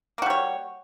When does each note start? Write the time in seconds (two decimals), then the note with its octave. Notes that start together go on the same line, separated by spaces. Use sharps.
0.18 A#3
0.22 F#4
0.26 G3
0.30 C#5